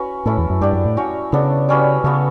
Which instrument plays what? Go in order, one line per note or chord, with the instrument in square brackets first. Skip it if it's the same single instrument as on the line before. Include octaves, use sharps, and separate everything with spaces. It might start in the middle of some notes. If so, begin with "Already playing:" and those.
Already playing: [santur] C#4 F#4 B4
[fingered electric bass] A2 [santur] C#4 E4 A4
[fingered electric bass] E2
F#2
[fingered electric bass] G2 [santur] D4 G4 D5
[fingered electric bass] F#2
A2
[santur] C#4 F#4 C#5
[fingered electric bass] C#3 [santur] B3 D4 A4
[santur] G3 C#4 F#4 B4
[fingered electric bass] C#3 [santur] B3 F#4 A4